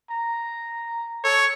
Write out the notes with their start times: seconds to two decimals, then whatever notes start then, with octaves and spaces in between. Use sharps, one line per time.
0.10 A#5
1.24 A4 C#5